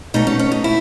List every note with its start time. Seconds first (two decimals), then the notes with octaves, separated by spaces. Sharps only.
0.14 B2 A3 C#4 D#4
0.27 C#4
0.39 C#4
0.52 D#4
0.64 E4